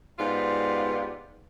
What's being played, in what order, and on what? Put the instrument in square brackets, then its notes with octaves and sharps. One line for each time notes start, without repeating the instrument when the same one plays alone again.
[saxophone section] G#2 B3 F4 G4 D5